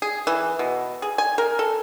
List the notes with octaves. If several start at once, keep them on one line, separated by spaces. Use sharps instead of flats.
G#4
E3
B2
G#4
G#5
A#4
A4